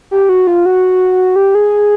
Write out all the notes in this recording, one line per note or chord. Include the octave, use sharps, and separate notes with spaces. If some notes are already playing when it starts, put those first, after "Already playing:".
G4
F#4
F4
F#4
G4
G#4